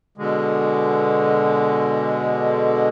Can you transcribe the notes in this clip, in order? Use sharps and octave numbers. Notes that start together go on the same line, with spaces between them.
B2 D3 G#3